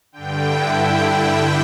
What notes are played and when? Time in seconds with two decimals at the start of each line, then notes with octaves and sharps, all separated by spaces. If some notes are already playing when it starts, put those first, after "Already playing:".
0.12 D3 G5
0.18 G2
0.47 E4